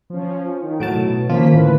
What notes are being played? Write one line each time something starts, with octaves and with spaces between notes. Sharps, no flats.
F3 C#4
D#3
A2 F#3 A5 D7
B2
D#3 F3 A#3 C#4 F4 B6
A2 D3 E3 B4